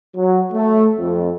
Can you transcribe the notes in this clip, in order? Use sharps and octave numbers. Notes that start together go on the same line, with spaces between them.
F#3
A3
F2